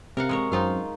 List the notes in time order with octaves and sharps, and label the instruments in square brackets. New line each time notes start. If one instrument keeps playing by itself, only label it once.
[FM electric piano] C3 [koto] A#4 F5 F#5
[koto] G#3 A#4 C#5
[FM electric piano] F#2 C4 [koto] D#4 F4 F5